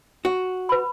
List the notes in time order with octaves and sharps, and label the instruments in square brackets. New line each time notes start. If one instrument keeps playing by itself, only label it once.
[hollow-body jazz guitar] F#4
[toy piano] B4 B5